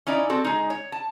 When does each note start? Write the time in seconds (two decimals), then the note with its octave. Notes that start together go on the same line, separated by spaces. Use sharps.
0.07 C#4 D#4 E4 D5
0.30 C4 F#4 A4
0.44 G#3 D#4
0.70 C#5
0.92 A5